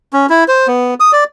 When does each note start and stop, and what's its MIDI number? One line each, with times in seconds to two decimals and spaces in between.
0.13 0.26 61
0.30 0.44 64
0.48 0.67 72
0.67 0.94 59
1.00 1.12 87
1.13 1.24 74